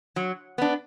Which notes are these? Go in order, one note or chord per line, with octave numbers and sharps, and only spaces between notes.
F#3
B3 D4